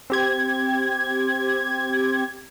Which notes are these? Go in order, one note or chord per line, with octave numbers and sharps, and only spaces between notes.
C4 G4 G#6